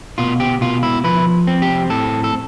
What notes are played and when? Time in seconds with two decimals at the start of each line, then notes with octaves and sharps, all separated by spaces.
0.18 B2 F4
0.40 G4
0.61 B2 F4
0.83 E4
1.04 F3 B4
1.47 C4
1.62 G4
1.90 A2 A4
2.24 A4